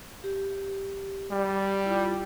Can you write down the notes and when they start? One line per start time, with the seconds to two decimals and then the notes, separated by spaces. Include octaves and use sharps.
0.24 G4
1.31 G3
1.86 E4 F4